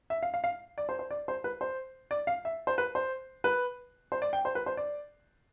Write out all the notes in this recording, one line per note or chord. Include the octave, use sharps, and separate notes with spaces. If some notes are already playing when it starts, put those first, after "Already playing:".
E5
F5
F5
F5
D5
C5
C5
D5
C5
B4
C5
D5
F5
E5
C5
B4
C5
B4
C5
D5
G5
C5
B4
C5
D5